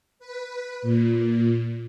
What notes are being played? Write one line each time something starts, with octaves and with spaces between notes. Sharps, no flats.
B4
A#2